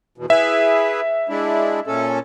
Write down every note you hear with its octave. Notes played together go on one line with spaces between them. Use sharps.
E2 B2
E4 G#4 B4 E5
G#3 D4 E4
A#2 C#4 A4